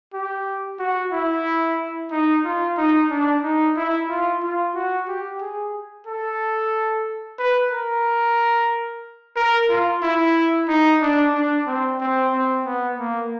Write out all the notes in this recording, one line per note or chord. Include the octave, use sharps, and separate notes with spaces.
G4
F#4
E4
D#4
F4
D#4
D4
D#4
E4
F4
F4
F#4
G4
G#4
A4
B4
A#4
A#4
F4
E4
D#4
D4
D4
C4
C4
C4
B3
A#3